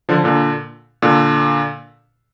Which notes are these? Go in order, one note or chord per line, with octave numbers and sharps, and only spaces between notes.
D3 F3
A#2 D3
A#2 D3